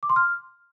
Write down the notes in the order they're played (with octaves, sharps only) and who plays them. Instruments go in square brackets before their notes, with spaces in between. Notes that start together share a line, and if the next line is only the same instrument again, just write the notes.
[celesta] D6
C6
F6